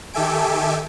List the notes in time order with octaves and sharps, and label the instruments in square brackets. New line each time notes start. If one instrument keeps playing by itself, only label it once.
[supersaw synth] D#3 G4 A4 E5 G#5 D7